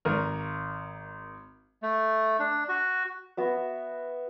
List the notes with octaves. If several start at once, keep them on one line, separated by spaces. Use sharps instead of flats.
G#1 A#4 F6
A3
D4
F#4
B3 F#4 E5